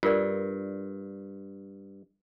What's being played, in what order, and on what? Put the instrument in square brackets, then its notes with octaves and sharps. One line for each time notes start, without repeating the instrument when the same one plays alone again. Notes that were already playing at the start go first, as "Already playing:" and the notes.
[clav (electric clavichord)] G2 [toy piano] F4 A#4 D5